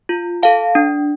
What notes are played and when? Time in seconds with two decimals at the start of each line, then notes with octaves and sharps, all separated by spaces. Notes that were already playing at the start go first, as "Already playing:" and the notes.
0.09 F4
0.43 A4 F5 A5
0.75 D4